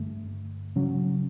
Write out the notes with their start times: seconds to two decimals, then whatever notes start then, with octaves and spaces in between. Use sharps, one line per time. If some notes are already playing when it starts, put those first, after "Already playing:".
Already playing: G2 D3 A3
0.76 C#3 F#3 C#4